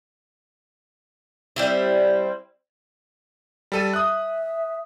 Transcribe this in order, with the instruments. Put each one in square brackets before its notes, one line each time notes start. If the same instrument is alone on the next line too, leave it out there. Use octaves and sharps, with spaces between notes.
[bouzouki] G3 C4 E4
[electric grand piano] G3 A4 D#7
[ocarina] E5 [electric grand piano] D#6 F#6